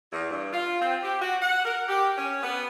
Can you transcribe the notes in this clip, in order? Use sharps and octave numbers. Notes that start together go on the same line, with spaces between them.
E2
G2
F4
C4
G4
F#4
F#5
A#4
G4
C#4
B3